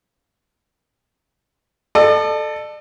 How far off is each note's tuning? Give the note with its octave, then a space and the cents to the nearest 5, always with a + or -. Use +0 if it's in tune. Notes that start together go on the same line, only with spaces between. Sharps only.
A4 +0 D5 +45